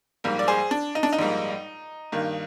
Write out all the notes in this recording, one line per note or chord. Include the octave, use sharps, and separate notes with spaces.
A#1 G#2 G3 A#3
D5
G#4 C5
D4
D#4
D4
D#4
A#1 G#2 G3 A#3
G2 D#3 A#3